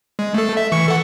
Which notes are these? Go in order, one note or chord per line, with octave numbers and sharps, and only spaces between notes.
G#3
A3 A4
E5
E3 C#6 C#7
A4 F#5